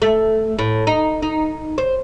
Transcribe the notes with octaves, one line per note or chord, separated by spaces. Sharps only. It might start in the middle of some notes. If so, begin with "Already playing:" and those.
A3
A2
D#4
D#4
C5